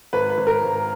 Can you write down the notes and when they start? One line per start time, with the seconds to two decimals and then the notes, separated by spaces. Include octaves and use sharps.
0.13 G#1 B4
0.30 B4
0.37 G#1
0.47 A#4
0.63 G#1